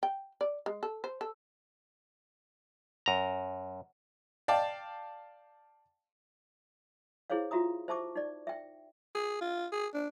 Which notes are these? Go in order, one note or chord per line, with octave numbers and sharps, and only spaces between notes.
G5
D5
G#3
A4
C5
A4
F#2 A#5
D5 F5 G5 A5
E4 G#4 C5 C#5 F5
F4 F#4 E5 A#5 D#6
C5 E5 A5 C#6 D6
D#4 D5
E5 G5
G#4
F4
G#4
D4